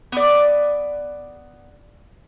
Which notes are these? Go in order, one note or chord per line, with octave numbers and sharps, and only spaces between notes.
B3 D5